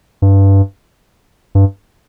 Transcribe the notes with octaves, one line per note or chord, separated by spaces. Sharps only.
G2
G2